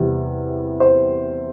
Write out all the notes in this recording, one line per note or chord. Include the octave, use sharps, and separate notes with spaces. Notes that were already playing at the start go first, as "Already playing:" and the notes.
Already playing: E2 C3 G3
C5